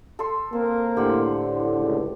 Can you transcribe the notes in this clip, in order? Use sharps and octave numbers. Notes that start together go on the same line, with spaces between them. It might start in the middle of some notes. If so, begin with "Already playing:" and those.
A4 C6
A#3 C4
A2 D3 G4 C5 F#5
C#2